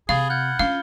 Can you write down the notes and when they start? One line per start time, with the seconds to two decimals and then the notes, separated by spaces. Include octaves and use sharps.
0.09 C3 G#4 F5 B5 A6 G7
0.30 F#5 F6 G6 G#6
0.59 C#4 F4 F5 F6 C#7 G7